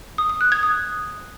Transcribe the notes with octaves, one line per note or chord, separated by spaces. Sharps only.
D#6
D#6
F#6
G#6
D#6